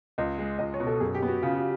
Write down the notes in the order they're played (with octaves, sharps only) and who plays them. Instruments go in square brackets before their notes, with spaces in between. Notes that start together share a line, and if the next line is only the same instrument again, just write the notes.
[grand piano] C#2 [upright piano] D#5
[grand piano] G#3
[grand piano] C#2 [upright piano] D#5
[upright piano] C#5
[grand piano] B2
[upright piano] A4
[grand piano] F#2 [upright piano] G#4
[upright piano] G4
[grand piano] B3
[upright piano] F#4
[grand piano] C#3 [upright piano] F4
[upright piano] F#4